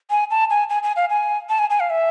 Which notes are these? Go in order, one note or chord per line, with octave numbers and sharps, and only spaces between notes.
G#5
A5
G#5
G#5
G#5
F5
G#5
A5
G#5
G#5
F5
E5